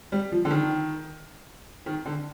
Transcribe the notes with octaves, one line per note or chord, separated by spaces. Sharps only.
G3
F3
D3
D#3
D#3
D3